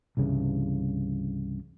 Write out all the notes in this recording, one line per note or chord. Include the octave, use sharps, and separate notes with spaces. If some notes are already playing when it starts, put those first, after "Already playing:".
C2 G2 C#3 E3